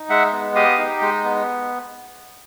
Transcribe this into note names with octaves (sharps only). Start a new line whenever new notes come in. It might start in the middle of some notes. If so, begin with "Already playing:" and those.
Already playing: D#4
G#3 E5 F#5
B3
G4 D#5 F5
D#4
G#3
B3